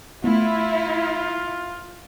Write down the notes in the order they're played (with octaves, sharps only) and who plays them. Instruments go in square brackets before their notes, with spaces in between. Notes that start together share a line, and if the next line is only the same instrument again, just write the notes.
[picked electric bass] A3 B3 [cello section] E4 [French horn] F4